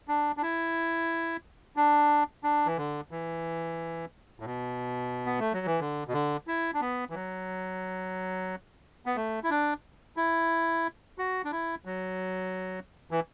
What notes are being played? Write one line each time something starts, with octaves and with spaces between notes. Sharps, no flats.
D4
D4
E4
D4
D4
E3
D3
E3
A2
B2
B3
A3
F#3
E3
D3
B2
D3
E4
D4
B3
E3
F#3
B3
A3
E4
D4
E4
F#4
D4
E4
F#3
E3